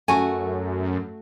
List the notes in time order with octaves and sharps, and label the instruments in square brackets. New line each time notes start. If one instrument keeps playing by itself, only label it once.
[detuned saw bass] F#2 [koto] A3 F#4 [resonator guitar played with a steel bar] G#5